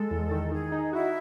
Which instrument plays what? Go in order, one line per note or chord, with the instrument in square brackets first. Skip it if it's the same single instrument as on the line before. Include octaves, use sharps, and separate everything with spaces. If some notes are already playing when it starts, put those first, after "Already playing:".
Already playing: [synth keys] G#3 [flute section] A4
[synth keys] E2
D#3
[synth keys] D#4 [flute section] G#4
[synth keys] D#4
[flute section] E4 [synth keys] F#4